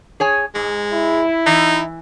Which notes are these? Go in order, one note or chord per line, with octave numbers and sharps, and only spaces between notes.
G#4 C#5 G#5
G#2 G#3
E4
E3 D#4